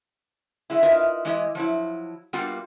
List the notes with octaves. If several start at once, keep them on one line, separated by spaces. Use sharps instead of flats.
F#3 G#3 E4
D#4 F4 A#4 B4 D#5 E5
E3 G#3 E4 G4 D#5
F3 F#3 E4
G3 A#3 B3 F4 F#4